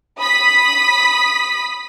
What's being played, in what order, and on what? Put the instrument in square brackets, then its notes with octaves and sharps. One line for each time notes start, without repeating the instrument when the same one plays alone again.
[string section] B5 D#6 B6